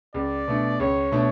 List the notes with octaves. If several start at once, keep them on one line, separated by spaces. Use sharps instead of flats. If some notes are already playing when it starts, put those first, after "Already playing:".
C#2 D5
B2 A3 D4
C#2 C#5
B2 A3 D4